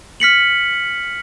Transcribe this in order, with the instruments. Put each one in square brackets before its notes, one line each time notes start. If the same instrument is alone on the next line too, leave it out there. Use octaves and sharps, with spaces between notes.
[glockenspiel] F6 B6 C#7 F#7